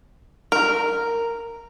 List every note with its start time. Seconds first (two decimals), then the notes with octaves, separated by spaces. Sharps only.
0.52 A#4